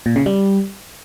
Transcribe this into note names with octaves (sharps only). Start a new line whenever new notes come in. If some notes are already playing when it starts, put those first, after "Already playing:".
A#2
C#3
G3